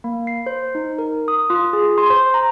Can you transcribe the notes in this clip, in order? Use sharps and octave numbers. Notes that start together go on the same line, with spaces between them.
A#3
C7
C5
D#4
A#4
D#6
F4
G#4
C6
C5
A#5